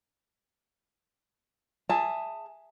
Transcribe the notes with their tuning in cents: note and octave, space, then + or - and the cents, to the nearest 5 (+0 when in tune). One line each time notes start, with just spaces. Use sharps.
G#4 +0 E5 +0 A5 +15